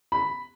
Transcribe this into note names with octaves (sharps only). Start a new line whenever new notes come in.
B5